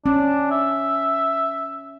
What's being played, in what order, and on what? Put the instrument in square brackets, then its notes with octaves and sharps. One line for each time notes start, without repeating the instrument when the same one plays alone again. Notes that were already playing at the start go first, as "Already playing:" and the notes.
[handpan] C#4 [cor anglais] D4
[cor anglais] E5